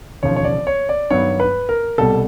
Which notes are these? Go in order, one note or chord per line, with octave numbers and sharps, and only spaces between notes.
E1 D#2 C#3 F3 C#5
C#5
D5
C#5
D5
G2 D#3 F#3 B3 C#5
B4
A#4
C2 B2 G3 A4